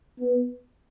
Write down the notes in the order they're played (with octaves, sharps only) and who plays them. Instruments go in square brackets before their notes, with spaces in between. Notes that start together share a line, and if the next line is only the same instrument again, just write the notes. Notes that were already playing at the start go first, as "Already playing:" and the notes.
[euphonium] B3